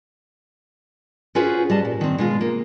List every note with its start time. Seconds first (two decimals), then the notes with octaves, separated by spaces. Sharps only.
1.35 C#4 F4 F#4 G#4 B4 C5
1.70 G3 D#5 A5
1.85 A#2
2.01 D#3 C4
2.18 B2 G#3 F4
2.41 A#3